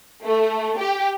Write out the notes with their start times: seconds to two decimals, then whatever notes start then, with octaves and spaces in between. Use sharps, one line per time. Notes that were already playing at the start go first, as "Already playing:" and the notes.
0.24 A3
0.79 G4